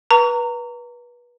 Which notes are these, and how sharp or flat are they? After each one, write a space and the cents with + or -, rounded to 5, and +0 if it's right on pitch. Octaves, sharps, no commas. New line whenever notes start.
B4 -30 A#5 -25 C#6 +40